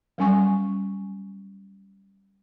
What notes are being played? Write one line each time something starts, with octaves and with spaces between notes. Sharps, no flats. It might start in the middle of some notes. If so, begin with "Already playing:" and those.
F#3 G3 C#4 G#5 C#6